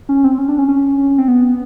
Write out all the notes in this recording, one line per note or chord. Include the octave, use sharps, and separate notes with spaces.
C#4
C4
C#4
D4
C#4
C#4
C4
B3